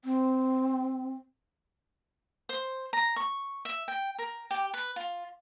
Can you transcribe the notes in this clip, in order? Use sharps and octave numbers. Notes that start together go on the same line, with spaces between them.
C4
C5
A#5
C#6
E5
G5
A#4
G4
B4
F4